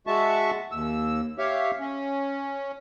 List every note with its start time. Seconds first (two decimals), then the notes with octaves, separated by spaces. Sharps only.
0.07 G#3 F#4 E5 A5 C#6
0.72 D#2 E6
1.38 G4 C#5 E5 F5
1.79 C#4